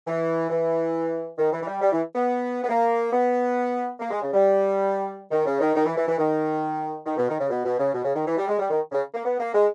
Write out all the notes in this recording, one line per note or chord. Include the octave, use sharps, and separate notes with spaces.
E3
E3
D#3
E3
E3
G3
G3
E3
B3
B3
A#3
B3
A#3
G#3
C#3
G3
D#3
C#3
D#3
D#3
E3
E3
E3
D#3
D#3
B2
D#3
C#3
B2
B2
C#3
B2
C#3
D#3
E3
G3
G#3
G3
D#3
C#3
A#3
B3
A#3
G#3